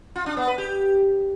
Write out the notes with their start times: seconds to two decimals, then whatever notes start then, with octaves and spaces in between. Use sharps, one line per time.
0.16 F4
0.26 D4
0.37 B3
0.47 B4
0.58 G4